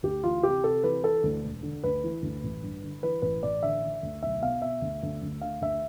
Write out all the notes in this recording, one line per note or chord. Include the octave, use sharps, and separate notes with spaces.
D2 G4
E3 F4
C3 G4
C3 A4
E3 B4
E3 A4
D2
E1
D3
D2 B4
E3
D2
A1
G2
D3
E3 B4
A1 B4
A1 D5
D3 E5
D3
D2
B1 E5
B2 F5
B2 E5
D2
D2
D2
D3 F5
D2 E5